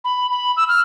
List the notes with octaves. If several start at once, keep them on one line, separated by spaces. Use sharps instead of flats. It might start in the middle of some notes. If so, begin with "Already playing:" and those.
B5
B5
E6
F6